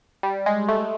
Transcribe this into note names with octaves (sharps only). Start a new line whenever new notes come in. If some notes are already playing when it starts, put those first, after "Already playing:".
G3
G#3
A3